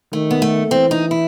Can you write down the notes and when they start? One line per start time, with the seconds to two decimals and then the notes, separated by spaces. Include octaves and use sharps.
0.12 D#3 A3
0.31 B3
0.42 A3
0.71 E3 C4
0.91 D#4
1.11 E4